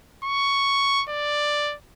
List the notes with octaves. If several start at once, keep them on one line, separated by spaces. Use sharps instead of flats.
C#6
D5